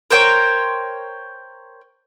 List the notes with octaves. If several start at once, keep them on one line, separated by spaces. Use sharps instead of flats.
A#4 C5 C#5 G5